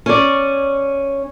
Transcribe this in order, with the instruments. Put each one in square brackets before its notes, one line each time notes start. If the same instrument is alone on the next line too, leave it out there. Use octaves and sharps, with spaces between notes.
[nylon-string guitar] C#4 D5